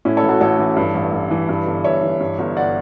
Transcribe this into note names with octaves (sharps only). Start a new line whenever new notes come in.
A2 C#4 E4
A4 C#5
A1
F#4 A4
A1 A4 C#5
E3
G2
A1
A1
E3
G2
G1
G1 C#5 E5
E3
G2
G1
D5 F#5